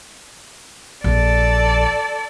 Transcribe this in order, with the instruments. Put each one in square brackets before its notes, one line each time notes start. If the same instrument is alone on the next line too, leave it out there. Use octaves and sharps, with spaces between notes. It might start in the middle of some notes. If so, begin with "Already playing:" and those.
[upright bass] A#1 [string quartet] A4 D5